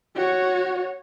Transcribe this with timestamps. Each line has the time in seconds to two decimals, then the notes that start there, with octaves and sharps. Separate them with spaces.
0.16 F#4 C#5